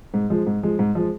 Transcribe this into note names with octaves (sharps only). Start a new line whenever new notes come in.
G#2
F3 G#3
G#2
F3 G#3
G#2
F3 G#3